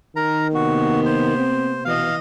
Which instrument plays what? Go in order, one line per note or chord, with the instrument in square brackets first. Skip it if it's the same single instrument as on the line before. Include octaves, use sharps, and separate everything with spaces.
[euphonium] D#3 [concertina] A#4 A#5
[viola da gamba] C3 A#3 B3 [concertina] F#4
[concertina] C5
[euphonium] C4
[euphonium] B2 [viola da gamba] E3 D#5 [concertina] F5